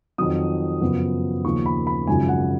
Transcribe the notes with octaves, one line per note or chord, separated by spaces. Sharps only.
F2 D#3 F#3 D#6
F#2 C#3 F3 B3
D#2 C#3 F3 A#3 C#4 C#6
B5
B5
G#1 F#2 C#3 F3 G#5
F#5